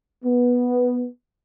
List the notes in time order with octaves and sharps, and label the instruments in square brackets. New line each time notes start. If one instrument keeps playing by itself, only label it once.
[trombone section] B3